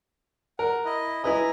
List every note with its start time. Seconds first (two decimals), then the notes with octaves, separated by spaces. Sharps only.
0.59 A#4 F#5
0.85 E4 D#5
1.24 E4 B4 D#5 G#5 A#5